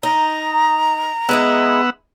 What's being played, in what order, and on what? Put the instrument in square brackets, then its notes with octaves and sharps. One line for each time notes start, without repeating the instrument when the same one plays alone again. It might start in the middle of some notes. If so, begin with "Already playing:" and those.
[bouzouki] D#4 [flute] A#5
[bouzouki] G#3 D#4 E4 [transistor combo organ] B3 F#5 E6